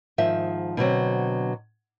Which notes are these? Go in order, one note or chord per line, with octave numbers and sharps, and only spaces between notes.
G#2 D#3 F3 E5
B2 D3 F#3 C4